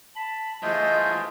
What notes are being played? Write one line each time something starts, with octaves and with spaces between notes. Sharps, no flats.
A5 B5
E3 A3 F4 G#4 C5 D#5 G6